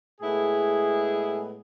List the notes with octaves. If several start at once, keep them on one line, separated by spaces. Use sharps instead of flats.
A2 G#3 B3 E4 G#4